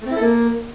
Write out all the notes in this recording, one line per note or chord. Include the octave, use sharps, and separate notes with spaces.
A3
C4
E4
A4
A#3